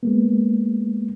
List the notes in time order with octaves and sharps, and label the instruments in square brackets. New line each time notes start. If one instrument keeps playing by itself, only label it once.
[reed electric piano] G#3 A#3 B3